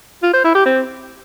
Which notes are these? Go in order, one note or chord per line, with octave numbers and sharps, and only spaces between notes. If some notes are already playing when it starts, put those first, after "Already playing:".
F4
C5
E4
G4
C4